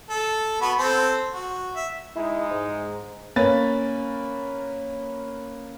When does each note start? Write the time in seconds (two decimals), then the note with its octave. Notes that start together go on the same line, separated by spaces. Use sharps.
0.10 A4
0.61 B3 F#4 B5
0.77 C4 A4 C5
1.34 F#4
1.76 E5
2.16 G#3 D#4 E4
2.51 G#2
3.36 A#3 C#4 B4 A6